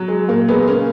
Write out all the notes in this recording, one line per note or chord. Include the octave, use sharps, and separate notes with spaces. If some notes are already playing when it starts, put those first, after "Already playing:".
Already playing: F#3
G#3
A#2 A#3
G#3 B3
C#3 A#3 C#4